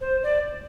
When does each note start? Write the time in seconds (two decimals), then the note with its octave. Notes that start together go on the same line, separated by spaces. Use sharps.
0.01 C5
0.23 D5